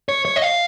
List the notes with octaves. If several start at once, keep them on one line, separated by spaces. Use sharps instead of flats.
C#5
C#5
D#5
F5